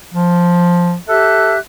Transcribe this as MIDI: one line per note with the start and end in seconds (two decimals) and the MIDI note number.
0.14 0.95 53
1.08 1.58 67
1.08 1.53 69
1.08 1.58 76
1.08 1.58 90